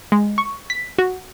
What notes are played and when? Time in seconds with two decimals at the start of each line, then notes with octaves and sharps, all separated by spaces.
0.12 G#3
0.38 C#6
0.70 B6
0.98 F#4